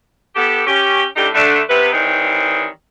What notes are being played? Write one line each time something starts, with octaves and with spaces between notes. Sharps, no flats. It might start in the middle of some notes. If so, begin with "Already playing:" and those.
B3 G4 A4
C#4 G4
A2 D3 D4 D#4 G4
D3 A3 D4
C3 B3 B4
D#3 E3 G3 C4 D#4 C#5